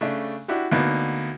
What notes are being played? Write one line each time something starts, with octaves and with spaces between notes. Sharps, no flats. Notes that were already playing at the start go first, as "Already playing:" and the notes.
C#3 A3 D4
D4 E4 F#4 G4
D2 A#3 B3 D#4 D5